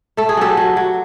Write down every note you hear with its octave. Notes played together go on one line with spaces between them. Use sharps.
A3 A4
G#4
F#3 G4 A4
F#3
F#3